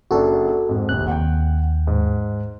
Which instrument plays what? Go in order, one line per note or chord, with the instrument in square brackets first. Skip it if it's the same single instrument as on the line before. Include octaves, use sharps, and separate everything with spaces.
[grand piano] F#1 D4 [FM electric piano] F#4 A4
[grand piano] F2 G#2
[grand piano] F1 A#1 D#2 [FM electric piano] F#6
[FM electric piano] D#2 [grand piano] F#5 G5
[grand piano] G#2